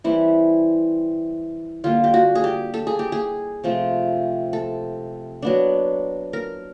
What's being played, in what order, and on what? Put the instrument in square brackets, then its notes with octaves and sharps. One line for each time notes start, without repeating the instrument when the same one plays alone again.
[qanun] E3 G3 C4 E4
D3 G3 A#3 F4
G4
F#4
G#4
G4
A4
G#4
G4
G#4
C3 F3 A3 C4
A4
F#3 B3 D4
A#4